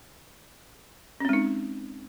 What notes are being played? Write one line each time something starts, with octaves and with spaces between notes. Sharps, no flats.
G#3 C4 C#4 D#4